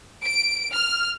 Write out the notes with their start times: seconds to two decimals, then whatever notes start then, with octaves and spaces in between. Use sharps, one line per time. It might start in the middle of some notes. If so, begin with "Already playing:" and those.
0.25 D7
0.74 F6